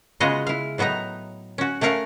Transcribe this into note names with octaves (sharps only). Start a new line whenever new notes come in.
C#3 G#3 B3 F4 F#4 D#5
E4 F5
A2 F#3 B3 D#4 A#5
C#4 F#4
A3 C#4 A#4 F5 F#5